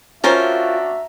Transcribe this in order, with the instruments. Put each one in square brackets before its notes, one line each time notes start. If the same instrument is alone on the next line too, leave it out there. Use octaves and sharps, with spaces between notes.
[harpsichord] C#4 [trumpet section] D4 F#4 E5 [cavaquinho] F4 A#4 C5 [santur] A#5